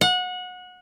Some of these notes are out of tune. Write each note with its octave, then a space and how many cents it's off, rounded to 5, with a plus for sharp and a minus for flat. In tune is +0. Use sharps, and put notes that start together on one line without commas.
F#5 -25